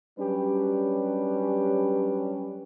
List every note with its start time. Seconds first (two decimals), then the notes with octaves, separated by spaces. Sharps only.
0.19 F#3 G3 C#4 D4 G4 B4